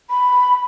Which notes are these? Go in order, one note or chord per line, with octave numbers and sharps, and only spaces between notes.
B5